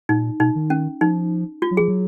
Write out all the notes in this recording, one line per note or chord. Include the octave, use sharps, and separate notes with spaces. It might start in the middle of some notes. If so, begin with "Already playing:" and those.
A#2 D#4
B2 D#4
D#3
C#4
F3 D#4
F4
F#3
F3 G#4
F#3